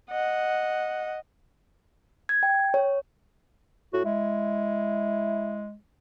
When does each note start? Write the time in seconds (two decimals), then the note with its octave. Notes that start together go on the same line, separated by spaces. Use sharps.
0.10 D#5 F#5
2.29 G#6
2.43 G5
2.74 C#5
3.93 A2 F#4
4.05 G#3 E4